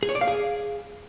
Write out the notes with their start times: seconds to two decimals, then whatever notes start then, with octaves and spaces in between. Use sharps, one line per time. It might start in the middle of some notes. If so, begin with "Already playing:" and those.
0.03 G#4
0.09 C#5
0.15 D5
0.21 F5
0.27 G#4